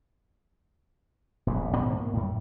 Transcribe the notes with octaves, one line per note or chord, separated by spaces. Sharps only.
E1 A#1 D#2 G#2
G#2 B2 D#3 A3
A#3
F#2 A2